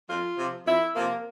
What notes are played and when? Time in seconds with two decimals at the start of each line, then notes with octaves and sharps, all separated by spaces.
0.09 F2 F4
0.38 C3 F3
0.66 F2 E4
0.95 C3 F3 A#3